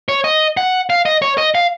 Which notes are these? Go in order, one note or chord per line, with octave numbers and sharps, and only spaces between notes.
C#5
D#5
F#5
F5
D#5
C#5
D#5
F5